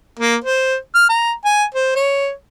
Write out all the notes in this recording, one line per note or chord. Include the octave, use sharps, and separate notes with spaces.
A#3
C5
F6
A#5
G#5
C5
C#5